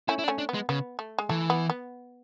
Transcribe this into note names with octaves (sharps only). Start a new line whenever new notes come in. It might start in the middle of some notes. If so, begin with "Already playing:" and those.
A3 C#4 E4
E4
D4
A3 C#4
D4
B3
G#3
C#3 B3
A3
G#3
E3 A3
B3
B3